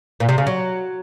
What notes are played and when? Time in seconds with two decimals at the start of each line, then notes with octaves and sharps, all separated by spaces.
0.20 A#2
0.29 C3
0.38 C#3
0.47 F#3